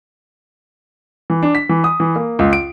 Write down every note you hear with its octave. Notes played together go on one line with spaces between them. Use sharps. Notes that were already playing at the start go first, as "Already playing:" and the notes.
E3
D4
B6
E3
D#6
E3
A#3
C#2
D7